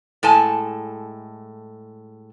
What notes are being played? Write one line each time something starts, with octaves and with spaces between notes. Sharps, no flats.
A2 G#3 A4 G#5 A5